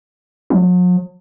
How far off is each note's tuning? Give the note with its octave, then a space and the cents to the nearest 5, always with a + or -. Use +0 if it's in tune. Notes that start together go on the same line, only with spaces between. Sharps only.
F#3 -45